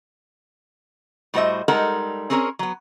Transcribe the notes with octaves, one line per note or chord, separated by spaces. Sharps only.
A2 G3 F#4 C5 D#5 E5
G3 G#3 D#4 A4 A#4 F#5
C4 C#4 G#4 A#4 C#5
F#3 B3